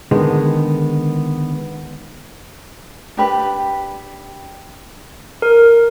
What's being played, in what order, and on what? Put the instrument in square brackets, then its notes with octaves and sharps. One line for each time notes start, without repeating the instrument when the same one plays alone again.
[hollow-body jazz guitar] D3 D#3 G#3 B3
[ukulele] D4 G4 B4
[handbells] A#4